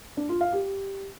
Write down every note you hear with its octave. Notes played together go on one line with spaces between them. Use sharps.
D4
F4
F5
G4